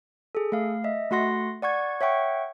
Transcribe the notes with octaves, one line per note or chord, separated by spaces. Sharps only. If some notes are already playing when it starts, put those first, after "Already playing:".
G#4 A4
A3 F5
D#5 E5
A3 F#4 F#5 C6 A#6
D5 F#5 C#6 G#6
C#5 E5 F#5 G5 C#6